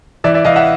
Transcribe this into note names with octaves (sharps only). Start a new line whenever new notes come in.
E3 D5 E5
D5 E5
E3 D#5 F5
E5 F#5